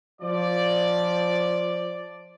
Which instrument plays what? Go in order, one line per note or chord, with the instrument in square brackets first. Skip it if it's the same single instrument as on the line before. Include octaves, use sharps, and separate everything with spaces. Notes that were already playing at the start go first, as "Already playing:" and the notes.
[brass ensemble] F3 D5